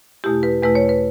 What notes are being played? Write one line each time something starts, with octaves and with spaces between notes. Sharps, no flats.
E2 B2 A3 E4 G4
B4
E2 B2 A3 E4 B4
C#5
B4